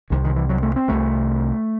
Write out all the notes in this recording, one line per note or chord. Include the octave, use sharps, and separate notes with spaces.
C2 C3 D#3
D#3
E3
F#3
A3
C4
C2 C3 A3